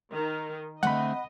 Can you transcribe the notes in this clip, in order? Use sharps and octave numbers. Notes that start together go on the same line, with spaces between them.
D#3
D3 A3 C4 D#5 F#5 B5